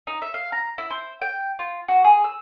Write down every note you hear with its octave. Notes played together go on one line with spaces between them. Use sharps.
D#4
E5
F5
A#5
E4
C5
G5
F4
F#4
G#4
E6